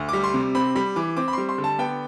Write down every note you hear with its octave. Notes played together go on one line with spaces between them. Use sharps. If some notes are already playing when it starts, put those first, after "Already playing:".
Already playing: D2
G3 D6
C6
C3
C4 B5
G3 B5
E3 D6
C4 D6
B5
G3 C6
C6
D3
A5
B3 G5